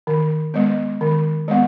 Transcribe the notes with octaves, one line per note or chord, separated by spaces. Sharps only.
D#3
G#3 B3
D#3
G#3 B3